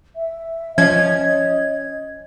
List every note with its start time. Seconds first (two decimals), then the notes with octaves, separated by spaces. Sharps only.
0.16 E5
0.78 F3 C#4 D#5 G#6